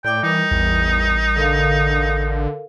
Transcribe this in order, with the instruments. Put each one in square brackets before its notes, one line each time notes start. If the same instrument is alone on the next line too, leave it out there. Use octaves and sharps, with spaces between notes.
[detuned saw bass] A2 [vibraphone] D5 D6 [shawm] G5
[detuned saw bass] E3 [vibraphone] G3 A#4 D#6 [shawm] D#4
[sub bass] A1 [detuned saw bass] E2
[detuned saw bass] D3 [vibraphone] A4 A#4 F5